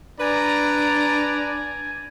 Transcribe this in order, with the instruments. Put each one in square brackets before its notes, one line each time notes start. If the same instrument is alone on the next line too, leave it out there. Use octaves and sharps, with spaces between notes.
[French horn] D4 [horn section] B4 A#5 [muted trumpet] D5 [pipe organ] G#5